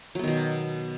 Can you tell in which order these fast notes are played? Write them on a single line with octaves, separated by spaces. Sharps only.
F#3 B3 D#3 B2